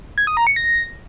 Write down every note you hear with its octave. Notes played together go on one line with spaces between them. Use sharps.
G#6
D#6
A#5
C#7
A#6